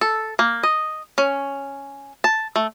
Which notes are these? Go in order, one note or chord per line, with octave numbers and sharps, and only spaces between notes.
A4
A#3
D#5
C#4
A5
A3